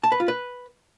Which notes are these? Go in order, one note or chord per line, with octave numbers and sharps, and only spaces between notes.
A5
B4
F4
B4